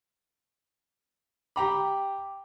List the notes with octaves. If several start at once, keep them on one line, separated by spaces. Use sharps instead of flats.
G4 G5 A#5 B5 D6